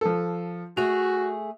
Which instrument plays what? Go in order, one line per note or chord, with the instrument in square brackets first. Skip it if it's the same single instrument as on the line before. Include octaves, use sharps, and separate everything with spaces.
[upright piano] F3 A4
[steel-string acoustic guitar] A3 G#4 [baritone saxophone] F#4 [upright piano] F7